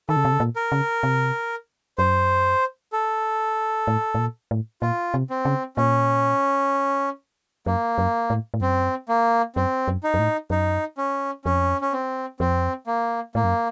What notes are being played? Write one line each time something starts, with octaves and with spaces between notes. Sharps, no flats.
D#3 A4
C#3
C3
C#3
A#2
A#4
C#3
C3
F#2 C5
A4
A2
A2
A#2
A2
A#2 F4
C3
C4
C#3
A#2 C#4
F#2 A#3
F#2
A2
A2
F#2 C4
A#3
F#2 C4
F#2
D#4
F#2
A2
F#2 D#4
C#4
F2 C#4
C#4
C4
F2 C4
A#3
A2 A#3
F#2